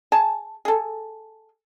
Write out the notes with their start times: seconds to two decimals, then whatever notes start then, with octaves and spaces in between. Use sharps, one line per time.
0.12 G#4 G#5 A5
0.65 G#4 A4